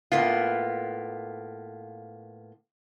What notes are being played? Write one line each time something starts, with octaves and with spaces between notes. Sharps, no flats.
A2 A#3 B3 F4